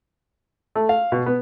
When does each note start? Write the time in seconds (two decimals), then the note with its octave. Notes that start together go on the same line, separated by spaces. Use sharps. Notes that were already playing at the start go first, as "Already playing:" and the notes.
0.75 A3
0.89 F5
1.12 B2
1.26 B3